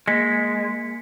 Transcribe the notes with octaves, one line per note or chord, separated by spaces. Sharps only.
G#3 A#3 B6 C#7